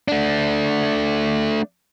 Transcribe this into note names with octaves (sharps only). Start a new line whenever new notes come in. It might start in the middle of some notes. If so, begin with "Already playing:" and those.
A3 D4